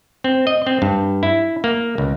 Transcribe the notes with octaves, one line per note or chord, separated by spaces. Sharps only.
C4
D#5
C4
G2
E4
A#3
C#2